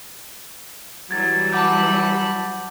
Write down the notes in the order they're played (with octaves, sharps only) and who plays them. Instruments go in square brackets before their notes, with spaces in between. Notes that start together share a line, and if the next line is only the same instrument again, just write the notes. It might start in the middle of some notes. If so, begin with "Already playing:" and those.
[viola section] E3 F#3 G3 [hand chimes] G#6 A6
[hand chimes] F#5 D6 G6 [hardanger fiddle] A5 B5